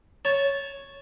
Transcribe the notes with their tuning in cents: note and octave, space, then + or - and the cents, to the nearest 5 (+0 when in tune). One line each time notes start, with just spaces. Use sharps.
C#5 +0 A5 -15